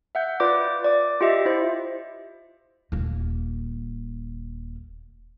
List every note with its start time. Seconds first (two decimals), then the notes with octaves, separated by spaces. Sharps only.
0.15 E5 F#5 G6
0.40 F4 B4 D5 D6
0.84 D5 D6
1.21 F4 G4 D#5 E5
1.45 E4 C5
2.92 D#1 A#3